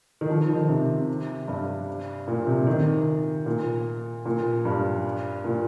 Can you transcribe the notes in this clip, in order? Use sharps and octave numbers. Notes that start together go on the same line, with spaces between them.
D#3
F3
D#3
C3
G2
A#2
C3
D#3
A#2
A#2
G2
A#2